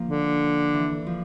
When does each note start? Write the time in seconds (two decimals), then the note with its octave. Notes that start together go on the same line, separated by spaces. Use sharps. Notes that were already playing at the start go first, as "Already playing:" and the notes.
Already playing: F3 A#3 D4
0.08 D3
0.74 E3
1.07 F3